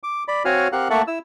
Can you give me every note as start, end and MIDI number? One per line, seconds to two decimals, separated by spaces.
0.03 0.24 86
0.28 0.43 74
0.28 0.43 83
0.45 0.68 60
0.45 0.68 66
0.45 0.68 73
0.45 0.68 77
0.45 0.68 80
0.45 0.68 89
0.72 0.88 60
0.72 0.88 67
0.72 0.88 70
0.72 0.88 77
0.72 0.88 78
0.72 0.88 90
0.90 1.02 57
0.90 1.02 58
0.90 1.02 76
0.90 1.02 78
0.90 1.02 81
0.90 1.02 85
1.07 1.19 64
1.07 1.19 88